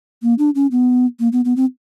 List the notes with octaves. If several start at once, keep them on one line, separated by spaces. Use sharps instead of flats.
A#3
D4
C#4
B3
A#3
B3
B3
C4